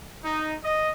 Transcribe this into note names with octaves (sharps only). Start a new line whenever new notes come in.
D#4
D#5